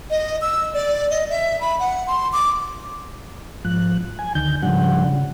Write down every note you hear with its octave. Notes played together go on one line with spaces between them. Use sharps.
D#5
E6
D5
D#5
E5
B5
F#5
C6
D6
G#2 F3 F#6
G#5
D2 D3 D#3 G6
G#2 C#3 F3 G3 D4 F#5
C#3